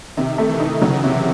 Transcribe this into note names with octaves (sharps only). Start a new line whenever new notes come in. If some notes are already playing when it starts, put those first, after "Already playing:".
C3 D#3
A3
E3
D#4
C#3 F#3
C3